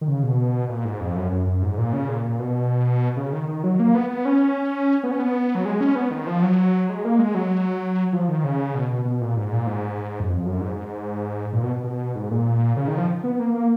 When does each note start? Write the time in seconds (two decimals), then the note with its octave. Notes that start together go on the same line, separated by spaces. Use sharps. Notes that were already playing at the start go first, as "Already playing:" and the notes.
0.01 D#3
0.08 C#3
0.23 B2
0.69 A#2
0.85 G#2
1.01 F2
1.16 F#2
1.32 F#2
1.47 F#2
1.62 G#2
1.78 A#2
1.93 C#3
2.08 A#2
2.25 A#2
2.39 B2
3.16 C#3
3.33 D#3
3.48 D#3
3.64 F#3
3.80 A#3
3.95 B3
4.10 B3
4.25 C#4
5.03 B3
5.11 C#4
5.20 B3
5.55 F#3
5.65 G#3
5.81 C#4
5.95 B3
6.11 D#3
6.27 F3
6.42 F#3
6.89 G#3
7.05 A#3
7.19 G#3
7.34 F#3
8.13 F3
8.28 D#3
8.44 C#3
8.75 B2
8.90 B2
9.05 B2
9.21 A#2
9.37 G#2
9.52 A#2
9.67 G#2
10.20 F#2
10.30 F2
10.45 F#2
10.61 G#2
10.76 G#2
11.53 A#2
11.63 B2
11.84 B2
12.15 G#2
12.31 A#2
12.76 C#3
12.88 D#3
12.98 F3
13.24 B3
13.40 A#3
13.54 A#3